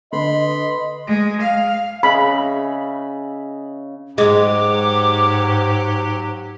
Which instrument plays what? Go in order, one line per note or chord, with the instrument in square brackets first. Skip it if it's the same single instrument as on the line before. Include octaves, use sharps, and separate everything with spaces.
[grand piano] D3 [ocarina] B4 [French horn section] D#5 [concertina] B5 C6
[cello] G#3
F5
[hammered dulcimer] C#3 D#5 E5 [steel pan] B5
[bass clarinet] G#2 [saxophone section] F#3 G4 [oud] G#3 [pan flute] D6